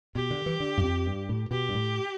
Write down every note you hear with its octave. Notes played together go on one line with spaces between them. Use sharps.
B2 G4
D3
E3
D3
G2
F2
G2
A2
B2 G4
G2
A2